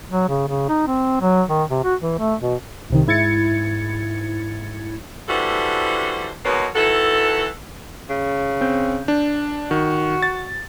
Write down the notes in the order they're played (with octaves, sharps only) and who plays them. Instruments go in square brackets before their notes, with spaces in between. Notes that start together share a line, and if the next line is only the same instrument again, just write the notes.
[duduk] F#3
C#3
C#3
D#4
C4
F#3
D#3
C3
F#4
E3
A3
B2
[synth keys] C2 C3 D#3
G#2 E4 G#6 A6 C#7
[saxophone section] D3 E3 G3 F#4 A4 C5
G#2 B2 G#3 A#3 B3 C#5
D#3 E3 F#4 A4
[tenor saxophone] C#3
[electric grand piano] C4 G6
D4
[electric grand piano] D#3 [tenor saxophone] F#4
[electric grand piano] A6